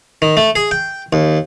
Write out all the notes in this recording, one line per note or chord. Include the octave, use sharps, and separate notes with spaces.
D#3
A3
G#4
G5
D#2